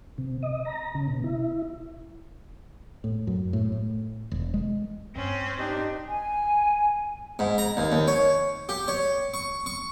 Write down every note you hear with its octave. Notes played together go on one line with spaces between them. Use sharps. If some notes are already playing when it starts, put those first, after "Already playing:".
C3
D#5
A#5
C#3
B2
E4
A2
F#2
A2
A2
E1
G#3
G2 C4 C#4
D4 D#4 G4
G#5
G#2
A#5
D#2
D#2
C#5
G4
C#5
C#6
C#6